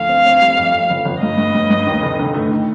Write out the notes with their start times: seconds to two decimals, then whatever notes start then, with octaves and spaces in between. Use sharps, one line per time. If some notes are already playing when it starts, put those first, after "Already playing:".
Already playing: D2 F3 F5
0.09 C4
0.25 C4
0.41 G3
0.57 F2
0.73 F2
0.90 G1
1.05 G1
1.21 G2 D#5
1.37 G2
1.54 G2
1.70 G2
1.87 D#2
2.03 F1
2.19 D3
2.34 A3
2.51 D#3